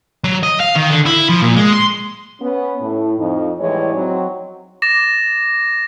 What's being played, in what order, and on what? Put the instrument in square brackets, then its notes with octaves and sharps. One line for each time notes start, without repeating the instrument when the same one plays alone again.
[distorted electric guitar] F#3
D#5
F5
D#3
D3
E4
F3
A#2
G#3
C6
[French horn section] B3 C#4
A2
F2 D#4
A2 E3 G3 G#3 C#5 D5
F#3 C4 D#4
[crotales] D6 A6 A#6 E7